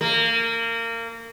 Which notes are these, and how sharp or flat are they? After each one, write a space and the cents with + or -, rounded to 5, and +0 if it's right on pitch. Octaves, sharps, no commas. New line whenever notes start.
A#3 -25